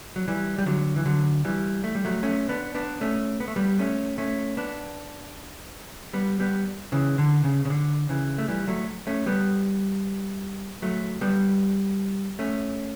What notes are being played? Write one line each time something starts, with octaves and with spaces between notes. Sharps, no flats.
F#3
E3 G3
G3
D3 F#3
E3
D3 F#3
E3 G3
A3
G3
F#3 A3
A3 C#4
B3 D4
B3 D4
A3 C#4
B3
A3
G3 B3
A3 C#4
A3 C#4
B3 D4
G3 B3
G3 B3
C#3 E3
D3
C#3
C#3
D3
C#3 E3
A3
E3 G3
F#3 A3
A3 C#4
G3 B3
F#3 A3
G3 B3
A3 C#4